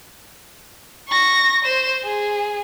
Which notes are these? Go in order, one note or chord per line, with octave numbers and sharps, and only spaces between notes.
C#6 A#6
C5 E7
G#4